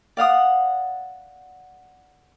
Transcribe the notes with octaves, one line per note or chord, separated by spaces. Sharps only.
D5 F5 F#5 D#6